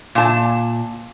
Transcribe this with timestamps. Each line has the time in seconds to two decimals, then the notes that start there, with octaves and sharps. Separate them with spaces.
0.15 A#2 A5